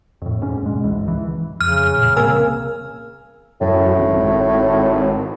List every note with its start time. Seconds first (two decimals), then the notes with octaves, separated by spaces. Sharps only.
0.22 F2 A2
0.41 E1 G#2 C#4
0.64 G2 B2 G#3
0.83 G1 C#2 G#2 E3
1.06 C#2 E3
1.61 F2 C#3 F6
1.96 A1 A#2
2.17 C2 A#3 C4 A#4 G#5 E6
3.61 F#2 A2
3.99 G#1